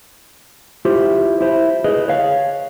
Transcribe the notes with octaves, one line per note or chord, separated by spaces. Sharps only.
E4 F4 G4 C5
E4 C5
G#4 B4 D#5
C#5 F5